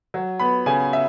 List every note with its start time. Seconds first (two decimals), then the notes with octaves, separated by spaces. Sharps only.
0.14 F#3
0.39 B3 B5
0.66 C#3 G#5
0.93 E5